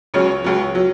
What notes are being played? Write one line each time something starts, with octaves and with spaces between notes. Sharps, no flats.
C#2 C#3 F#3 C#5
C#2 C#3 F#3
F#3